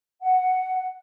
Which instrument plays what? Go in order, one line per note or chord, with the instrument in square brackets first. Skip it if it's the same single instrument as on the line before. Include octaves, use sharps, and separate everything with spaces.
[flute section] F#5